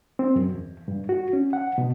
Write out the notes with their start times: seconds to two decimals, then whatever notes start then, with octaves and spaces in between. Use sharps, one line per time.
0.19 C4
0.36 F#2
0.54 E2
0.88 G2
1.09 F#4
1.33 C#4
1.53 F#5
1.78 B2